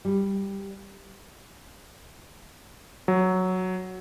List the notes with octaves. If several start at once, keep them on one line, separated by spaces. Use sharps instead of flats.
G3
F#3